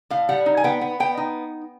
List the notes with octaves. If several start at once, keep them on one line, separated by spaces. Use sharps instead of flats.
A2 F5
G3 F#5
D#4
G#5
B3 G5
B3
B3 G5
D#4